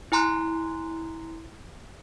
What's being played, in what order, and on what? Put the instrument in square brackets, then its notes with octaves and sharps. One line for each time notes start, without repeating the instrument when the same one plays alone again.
[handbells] E4 G#5 A#5 C6 F#6